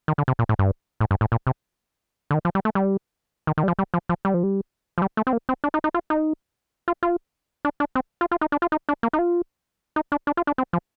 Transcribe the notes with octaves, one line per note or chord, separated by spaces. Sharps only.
D#3
D3
C3
A#2
A2
G2
A2
G2
A2
A#2
C3
D3
D#3
F3
G3
A3
G3
D#3
D#3
G3
F3
G3
F3
F3
G3
F3
G3
F3
G3
A3
C4
A#3
C4
D4
D#4
D#4
F4
D#4
F4
F4
D4
D4
C4
F4
F4
D#4
D4
F4
D#4
D4
A#3
D#4
F4
D#4
D4
D4
F4
D4
C4
F3